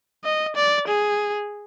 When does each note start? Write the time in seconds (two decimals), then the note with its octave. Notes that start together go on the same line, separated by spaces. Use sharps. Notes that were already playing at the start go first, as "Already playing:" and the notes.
0.24 D#5
0.56 D5
0.88 G#4